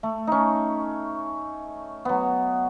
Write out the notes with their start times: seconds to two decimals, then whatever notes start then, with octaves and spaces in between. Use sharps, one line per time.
0.03 A3
0.27 C#4 D#4
2.05 F#3 B3